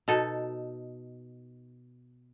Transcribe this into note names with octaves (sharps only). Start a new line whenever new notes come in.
B2 D#4 A4